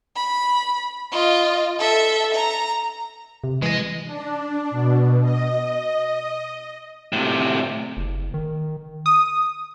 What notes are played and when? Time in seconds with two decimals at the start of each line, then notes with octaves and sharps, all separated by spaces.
0.16 B5
1.12 F4 D#5
1.79 A4 E5
2.34 A#5
3.44 C3
3.63 E3 G#3 D#5
4.05 D4
4.70 B2
5.21 D#5
7.13 A2 C3
7.97 F#1
8.34 D#3
9.06 D#6